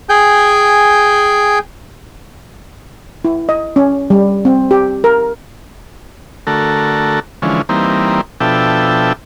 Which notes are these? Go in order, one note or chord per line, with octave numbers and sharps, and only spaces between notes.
G#4 G5 G#5 G6
E4
D#5
C#4
G3
C4
G4
A#4
D3 A3 F#4 A4 A#4
D3 E3 F3 G#3 C#4
E3 G3 A#3 C4 D#4
B2 F3 D4 A4 E5 G5